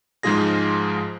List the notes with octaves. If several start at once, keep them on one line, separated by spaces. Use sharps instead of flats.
G#2 F3 G#3 F4 G#4 A#6